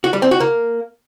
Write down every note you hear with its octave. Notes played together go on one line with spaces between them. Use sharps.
F#4
G3
C4
F#4
A#3